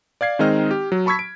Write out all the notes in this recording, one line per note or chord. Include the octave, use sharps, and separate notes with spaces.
D5 F5 G#6 C7
D#3 G#3 C4 D#4 D#5 F6
G4
F#3
A5 B5 C#6 E6 G#6 B6
D7